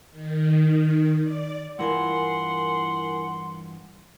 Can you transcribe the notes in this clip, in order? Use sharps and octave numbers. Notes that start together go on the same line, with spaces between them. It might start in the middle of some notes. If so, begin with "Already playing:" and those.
D#3
D5
G2 E3 E4 F4 A#4 F#5 G#5 C6